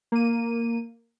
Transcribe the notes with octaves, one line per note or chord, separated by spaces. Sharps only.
A#3 D#7